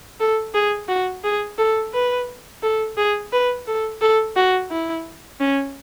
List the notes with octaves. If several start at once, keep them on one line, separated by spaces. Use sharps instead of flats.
A4
G#4
F#4
G#4
A4
B4
A4
G#4
B4
A4
A4
F#4
E4
C#4